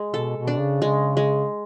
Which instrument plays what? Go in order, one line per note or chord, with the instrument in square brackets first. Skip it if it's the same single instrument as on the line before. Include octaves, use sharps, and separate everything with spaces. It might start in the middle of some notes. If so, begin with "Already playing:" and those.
Already playing: [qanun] G#3
[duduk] B2 [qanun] A4
[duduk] B2
[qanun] D4
[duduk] C#3
[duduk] C#3 [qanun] G#3
[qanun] G#3